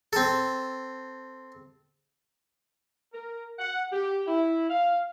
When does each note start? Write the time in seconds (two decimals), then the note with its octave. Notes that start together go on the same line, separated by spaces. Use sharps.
0.13 C4 A4
3.13 A#4
3.59 F#5
3.91 G4
4.27 E4
4.69 F5